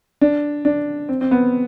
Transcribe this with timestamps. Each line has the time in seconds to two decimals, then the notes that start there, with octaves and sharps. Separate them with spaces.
0.21 D4
0.65 D4
1.09 C4
1.21 C4
1.31 B3